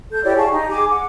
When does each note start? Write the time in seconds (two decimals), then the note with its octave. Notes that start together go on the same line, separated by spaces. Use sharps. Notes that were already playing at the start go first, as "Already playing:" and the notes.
0.11 A4 G6
0.24 E4 G4 C#5 D5
0.37 G#4 F5 A5 C#6
0.51 D#4 G4
0.70 G#4 G#5 D6
0.90 F#5 D6